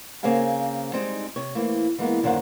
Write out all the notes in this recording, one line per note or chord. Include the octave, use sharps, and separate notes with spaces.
C#3 A#3 C4 G#4 F5 G#5
G3 G#3 C4 D#4
C3 C#5
E3 A3 A#3 C4
E3 G#3 A#3 B3
F#2 D3 D#3 A#3 C5 F#5